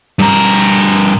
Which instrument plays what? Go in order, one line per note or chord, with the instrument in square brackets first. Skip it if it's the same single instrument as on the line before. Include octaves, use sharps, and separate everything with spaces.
[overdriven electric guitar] G2 A#4